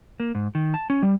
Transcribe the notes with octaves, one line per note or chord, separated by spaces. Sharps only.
A#3
G#2
D#3
A5
C#4
G3